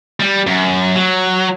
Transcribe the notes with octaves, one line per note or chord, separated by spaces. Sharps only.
G3
F#2
F#3